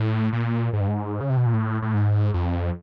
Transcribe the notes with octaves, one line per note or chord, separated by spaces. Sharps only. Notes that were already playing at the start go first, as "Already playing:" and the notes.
Already playing: A2
A#2
G#2
G2
G#2
C#3
C3
B2
A#2
A2
A2
G#2
F2